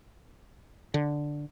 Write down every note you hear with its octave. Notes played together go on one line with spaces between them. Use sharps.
D3